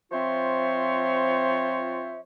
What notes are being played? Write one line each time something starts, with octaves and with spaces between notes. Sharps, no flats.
F3 C4 F4 C5 C#5 E5